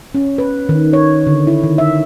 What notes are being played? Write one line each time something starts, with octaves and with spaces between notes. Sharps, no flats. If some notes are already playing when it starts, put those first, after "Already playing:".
C#4
B4
D#3
C#5
D3
E4
D#3
E5